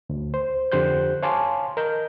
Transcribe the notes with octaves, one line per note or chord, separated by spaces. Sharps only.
D2
C5
F2 D3 G4 C5 F#6 G6
C#5 F5 G#5 A5 C6 D6
A#4 D#5 G6